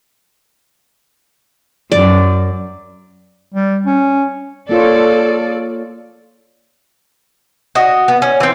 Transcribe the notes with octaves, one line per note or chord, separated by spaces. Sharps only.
F#2 D5
G3
C#4
A#3 F4 A4 C#5 D5
F#4 D#5
B3
C#4
E3 C4